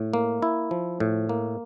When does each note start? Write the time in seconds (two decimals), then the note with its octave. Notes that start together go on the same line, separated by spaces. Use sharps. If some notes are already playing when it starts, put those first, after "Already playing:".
Already playing: A2
0.14 A#3
0.42 E4
0.71 F3
1.00 A2
1.29 A#3